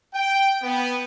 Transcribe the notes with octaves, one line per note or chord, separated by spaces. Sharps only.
G5
B3